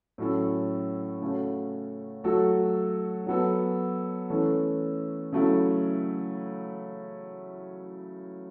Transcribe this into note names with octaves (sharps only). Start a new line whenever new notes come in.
A2 F#3 C#4 A4
C#3 A3 C#4 F#4
F#3 A3 F#4 A4
F#3 B3 A4
E3 A3 C#4 A4
C#3 F#3 A3 E4 A4